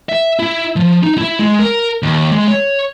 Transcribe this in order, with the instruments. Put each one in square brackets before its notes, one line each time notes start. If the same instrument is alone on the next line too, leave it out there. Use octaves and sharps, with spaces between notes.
[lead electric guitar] E5
E4
F3
D#4
E4
G#3
A#4
D#2
G#3
C#5